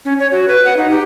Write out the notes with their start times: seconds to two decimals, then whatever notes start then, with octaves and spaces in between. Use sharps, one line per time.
0.05 C#4
0.19 C#5
0.32 F#4
0.48 B4
0.65 F#5
0.77 D#4
0.90 G4